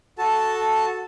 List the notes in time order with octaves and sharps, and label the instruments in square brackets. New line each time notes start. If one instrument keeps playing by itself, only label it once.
[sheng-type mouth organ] F#4 A4 A5